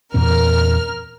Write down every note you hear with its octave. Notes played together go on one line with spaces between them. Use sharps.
E2 A#2 C4 A#4 F6